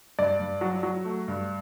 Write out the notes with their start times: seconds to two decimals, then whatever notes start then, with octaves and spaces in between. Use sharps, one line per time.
0.19 G2 D5
0.40 G2
0.61 F#3
0.83 F#3
1.05 A3
1.28 G2